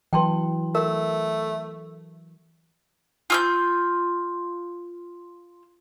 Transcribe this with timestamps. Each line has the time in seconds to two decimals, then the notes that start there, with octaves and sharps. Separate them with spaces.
0.13 E3 F#3 B4 G5 A5 C6
0.75 A3 A#4
3.30 F4 E6 G6